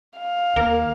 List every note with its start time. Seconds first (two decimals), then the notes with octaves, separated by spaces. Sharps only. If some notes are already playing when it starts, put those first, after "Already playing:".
0.18 F5
0.56 D#2 A#3 A#4